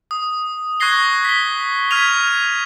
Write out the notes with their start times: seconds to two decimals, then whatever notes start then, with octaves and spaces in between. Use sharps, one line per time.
0.11 D#6
0.80 C#6 F#6 G#6 A#6 C7 G7
1.25 B6 G7
1.91 F6 G#6 B6 D#7 F7
2.27 D#7